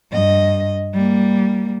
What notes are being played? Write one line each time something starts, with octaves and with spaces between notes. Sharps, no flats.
G2 D#5
G3 A#3